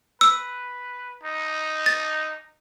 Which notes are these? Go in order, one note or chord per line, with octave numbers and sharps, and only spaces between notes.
B4 E6
D#4
A6